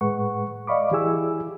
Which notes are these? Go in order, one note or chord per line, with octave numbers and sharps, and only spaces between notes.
A2 G#3 B4 F#5 C#6
D5 D#5 F5 B5 C#6 D6
E3 E4 G4 G#4 G#5 E6